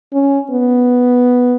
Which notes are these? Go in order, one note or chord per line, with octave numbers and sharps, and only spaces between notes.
C#4
B3